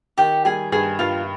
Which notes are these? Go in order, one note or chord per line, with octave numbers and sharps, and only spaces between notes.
D#3 G4 G5
G3 G#4 G#5
G2 G#4 G#5
G2 F4 F5